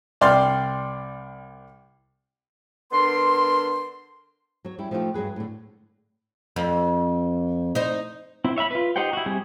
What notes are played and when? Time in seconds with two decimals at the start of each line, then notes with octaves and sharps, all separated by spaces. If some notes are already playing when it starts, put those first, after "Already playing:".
0.21 C2 D5 G5 C6 F6
2.92 D3 B3 D4 A#4 C6
4.65 F#3 C#5
4.78 G3 C#4 E4 G4
4.91 F3 A3 B3 D#4 F4 G4
5.14 G2 F#3 G#4 B4
5.36 A2 D3
6.56 F2
7.75 D#4 C5
8.44 C4 E4
8.56 C#5 E5 F5 B5
8.71 F4 B4
8.96 D#4 G4 C5 F#5 G5
9.13 E4 F#4
9.26 G3 C4 G4 G#4